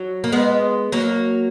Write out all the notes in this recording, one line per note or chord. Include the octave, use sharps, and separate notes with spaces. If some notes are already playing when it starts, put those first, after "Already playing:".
Already playing: F#3
A#3
G#3 B3
F#3 A#3